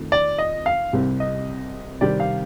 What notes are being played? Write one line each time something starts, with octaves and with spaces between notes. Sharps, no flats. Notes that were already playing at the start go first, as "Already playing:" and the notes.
Already playing: F2 D#3 A3
D5
D#5
F5
C2 C3 G3 C4
D#5
C3 D#3 G3 C4 G4 D5
F5